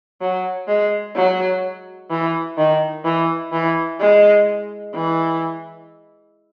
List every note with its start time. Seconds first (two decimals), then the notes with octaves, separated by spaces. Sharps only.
0.21 F#3
0.68 G#3
1.15 F#3
2.10 E3
2.58 D#3
3.05 E3
3.52 E3
4.00 G#3
4.95 E3